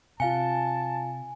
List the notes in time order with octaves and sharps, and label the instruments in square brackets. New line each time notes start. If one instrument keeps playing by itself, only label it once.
[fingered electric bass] C3 [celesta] F4 F5 C#7 [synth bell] G#5 [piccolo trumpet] A5